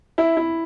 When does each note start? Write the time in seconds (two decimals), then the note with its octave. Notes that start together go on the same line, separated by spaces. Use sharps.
0.18 E4
0.37 E4